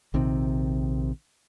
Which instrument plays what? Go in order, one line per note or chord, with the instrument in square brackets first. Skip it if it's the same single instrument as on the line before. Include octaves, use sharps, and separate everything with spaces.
[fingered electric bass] A#1 C3 D#3 C4